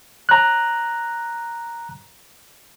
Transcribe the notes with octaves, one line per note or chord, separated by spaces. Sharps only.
A#5 F#6